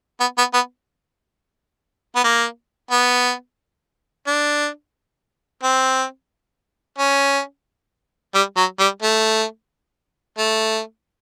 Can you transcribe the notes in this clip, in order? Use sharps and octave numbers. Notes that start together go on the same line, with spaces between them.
B3
B3
B3
B3
A#3
B3
D4
C4
C#4
G3
F#3
G3
A3
A3